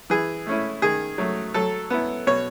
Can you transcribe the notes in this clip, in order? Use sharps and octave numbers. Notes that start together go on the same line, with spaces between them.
E3 G#4
A3 C#4 E4
D#3 G#4
F#3 A3
F#3 A4
B3 E4
B2 C#5